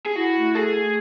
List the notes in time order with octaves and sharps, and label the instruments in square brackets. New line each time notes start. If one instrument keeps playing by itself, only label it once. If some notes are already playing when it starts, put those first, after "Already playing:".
[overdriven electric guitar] G#4
[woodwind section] E4 [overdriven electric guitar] F#4
[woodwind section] A3
[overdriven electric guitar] G#4 [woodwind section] A4
[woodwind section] A3